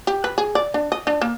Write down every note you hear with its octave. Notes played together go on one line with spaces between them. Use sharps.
G4
B4
G#4
D5
D4
D#5
D4
A#3